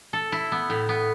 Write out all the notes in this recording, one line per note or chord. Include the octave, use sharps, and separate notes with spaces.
A4
E4
B3
A2
B3